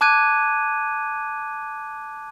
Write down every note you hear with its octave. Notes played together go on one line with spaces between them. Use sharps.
A5 D6 F#6 G#6 D#7